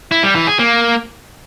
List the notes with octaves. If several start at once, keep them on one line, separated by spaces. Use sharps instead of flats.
E4
G3
E3
G#4
A#3